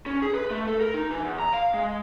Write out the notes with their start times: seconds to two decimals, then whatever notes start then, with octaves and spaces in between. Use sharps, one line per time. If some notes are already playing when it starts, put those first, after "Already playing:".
0.06 C#4
0.22 G#4
0.34 B4
0.51 A3
0.67 A4
0.81 A#4
0.94 D#4
1.11 E3
1.25 E2
1.39 A#5
1.53 F5
1.74 G#3